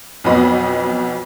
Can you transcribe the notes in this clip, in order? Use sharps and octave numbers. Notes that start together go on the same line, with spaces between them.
B1 F2 B3 D#5 B5